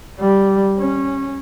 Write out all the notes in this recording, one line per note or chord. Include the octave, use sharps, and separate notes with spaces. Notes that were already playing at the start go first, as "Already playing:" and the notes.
G3
C#4